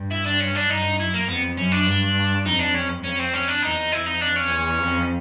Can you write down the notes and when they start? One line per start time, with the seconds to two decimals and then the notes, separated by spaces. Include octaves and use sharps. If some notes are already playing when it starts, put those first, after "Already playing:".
Already playing: G2
0.11 E4
0.26 D4
0.40 C#4
0.55 D4
0.70 G2 D#4
0.99 F#2 E4
1.14 A#3
1.28 F2 B3
1.57 F#2 C#4
1.72 D4
1.86 G2
2.46 F2 D#4
2.59 D4
2.74 C#4
3.04 F2 C#4
3.19 C4
3.33 C#4
3.48 D4
3.62 E2 D#4
3.92 F2 E4
4.06 D#4
4.21 D4
4.36 C#4
4.50 E2
4.79 F2